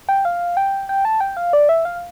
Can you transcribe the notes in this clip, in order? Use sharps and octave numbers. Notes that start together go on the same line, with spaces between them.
G5
F5
G5
G5
A5
G5
F5
D5
E5
F5